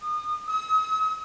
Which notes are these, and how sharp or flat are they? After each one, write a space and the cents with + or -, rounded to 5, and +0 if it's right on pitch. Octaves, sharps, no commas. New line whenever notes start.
D#6 -30
D#6 +45